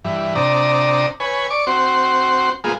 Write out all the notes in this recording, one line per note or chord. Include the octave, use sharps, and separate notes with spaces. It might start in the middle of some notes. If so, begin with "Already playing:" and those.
G2 E3
C3 D4 D5 A#5 D#6
B4 C#5 G#5
D5 C#6 D6
C4 F#4 C5
G#3 A#3 B3 F4 G#4